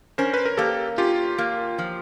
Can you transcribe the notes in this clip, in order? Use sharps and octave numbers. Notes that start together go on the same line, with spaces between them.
C#4 A#4 C5
B4
A#4
A#3 G4 A4
C#4 F4 G4
A#3
F3